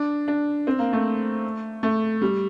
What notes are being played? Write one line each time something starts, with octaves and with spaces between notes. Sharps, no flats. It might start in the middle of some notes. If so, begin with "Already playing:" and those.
Already playing: D4
D4
C4
A#3
A3
A3
G3